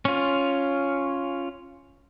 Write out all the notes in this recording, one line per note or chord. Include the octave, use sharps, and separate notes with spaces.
C#4 F4